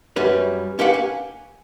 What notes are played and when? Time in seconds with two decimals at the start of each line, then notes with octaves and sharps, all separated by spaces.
0.16 F#2 G3 C#4 B4
0.79 C#4 G4 B4 F5 F#5
0.94 G#5